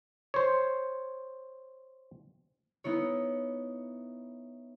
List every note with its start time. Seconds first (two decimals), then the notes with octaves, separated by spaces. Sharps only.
0.34 C5 C#5
2.84 B3 D#4 E4 C#5